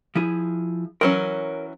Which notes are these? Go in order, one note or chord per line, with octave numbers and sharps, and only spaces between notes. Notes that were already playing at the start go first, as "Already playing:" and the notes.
F3 E4 G#4
E3 F#3 C#4 A#4 C#5